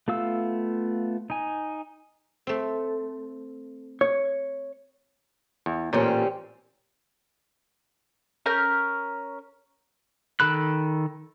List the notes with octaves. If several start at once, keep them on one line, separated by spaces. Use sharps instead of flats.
A3 B3 F4 F5 E6
D#4 G#5
A3 C4
C#5
E2
A1 A#2 G3 C4 C#4
C#4 A#4 F6 G6
D#3 A4 B5 F#6